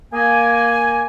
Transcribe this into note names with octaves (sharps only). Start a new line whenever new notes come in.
A#3 G#5